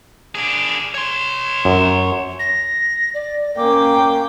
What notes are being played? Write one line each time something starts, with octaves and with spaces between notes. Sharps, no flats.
D4 G#4
C#5 C6
F#2
A#6
D5
A#3 C#4 G5 D6